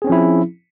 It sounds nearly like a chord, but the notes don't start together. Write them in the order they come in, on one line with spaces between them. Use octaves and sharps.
G#4 C4 C#4 F3 E4